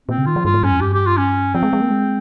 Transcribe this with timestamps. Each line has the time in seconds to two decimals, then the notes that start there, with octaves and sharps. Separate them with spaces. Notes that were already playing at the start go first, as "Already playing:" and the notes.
0.08 A#2 C4
0.18 C#3
0.26 D#3 F4
0.36 F3
0.45 G2 F4
0.54 G#2
0.63 G2 C#4
0.72 F2
0.81 G2 G4
0.94 G4
1.06 F4
1.17 C#4
1.54 F3 C4
1.63 G#3
1.73 G#3
1.81 A#3
1.91 G#3